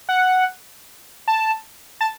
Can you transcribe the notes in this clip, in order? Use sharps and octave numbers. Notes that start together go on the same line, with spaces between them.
F#5
A5
A5